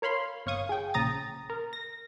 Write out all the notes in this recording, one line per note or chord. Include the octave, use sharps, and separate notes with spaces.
A#4 C#5 F5 B5 C6
G1 C#5 F5 C#6 D#6
G#4 G5
A#1 C#3 A#5 D#6 A6
A#4
A#6